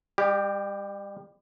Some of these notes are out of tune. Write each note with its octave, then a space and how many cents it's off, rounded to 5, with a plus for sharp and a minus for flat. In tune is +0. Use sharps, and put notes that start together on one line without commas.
G3 +40 G4 +0